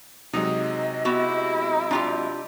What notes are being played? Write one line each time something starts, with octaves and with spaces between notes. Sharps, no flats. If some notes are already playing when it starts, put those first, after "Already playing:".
C3 F#3 G#3 D#4 D#5
B3 E4 F#4 G4
D4 F4 G4